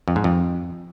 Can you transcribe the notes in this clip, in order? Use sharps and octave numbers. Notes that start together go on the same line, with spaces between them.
F2
G#2
F2